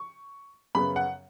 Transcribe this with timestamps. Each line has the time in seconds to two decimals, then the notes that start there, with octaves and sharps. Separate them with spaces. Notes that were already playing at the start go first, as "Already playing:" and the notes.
Already playing: C#6
0.75 F#2 C#3 B3 B5
0.96 F#5